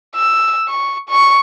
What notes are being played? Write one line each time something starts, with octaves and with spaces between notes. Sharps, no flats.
E6
C#6
C#6